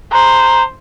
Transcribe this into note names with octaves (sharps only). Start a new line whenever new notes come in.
C5 A#5